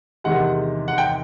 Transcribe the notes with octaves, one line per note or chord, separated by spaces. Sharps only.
E2 C3 D#3 G#3 F#5
F#5
G5